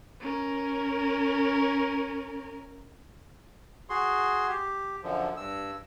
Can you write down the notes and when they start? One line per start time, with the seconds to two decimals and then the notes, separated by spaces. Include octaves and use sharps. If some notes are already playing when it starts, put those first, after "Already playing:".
0.20 C#4 A#4
3.89 F#4 G#4 C6
4.49 G4
5.03 F#2 D3 F3
5.37 G2 E6